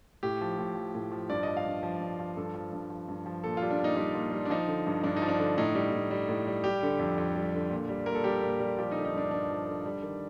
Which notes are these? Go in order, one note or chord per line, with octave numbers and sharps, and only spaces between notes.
A2 G4
F3
A2
F3
A2
F3
G2 D5
D#5
F3
F5
G2
F3
G2
F3
G2 A4
F3
G2
F3
G2
F3
A#2 A4
F4
G3
D4
A#2 D#4
G3 D4
A#2
G3
D4
F3 D#4
D3
G2
G2 D4
D#4
F3
D4
D3
A2 D#4
G3
A2
G3
A2
G3
G3 G4
D3
F2
F2
G3
D3
A#2
G3
A#2 A#4
A4
G3 G4
A#2
G3
F3 G4
D#4
D3
D#4
G2 D4
G2 D4
F3
D3
G3
D#3